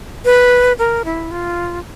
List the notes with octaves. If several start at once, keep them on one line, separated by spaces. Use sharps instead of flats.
B4
A#4
E4
F4